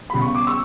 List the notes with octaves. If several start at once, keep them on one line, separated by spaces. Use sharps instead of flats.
E2 C#3 G3 B5
C#6
D6
C#6 E6